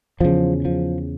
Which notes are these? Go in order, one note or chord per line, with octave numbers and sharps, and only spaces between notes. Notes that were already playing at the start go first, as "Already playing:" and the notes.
E2 C#3 F3
F3